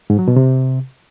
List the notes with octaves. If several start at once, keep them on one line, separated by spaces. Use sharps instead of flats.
G#2
F#3
B2
C3